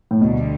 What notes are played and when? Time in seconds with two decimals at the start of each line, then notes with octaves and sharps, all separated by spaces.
0.11 A2
0.20 D2 B2 D3 G3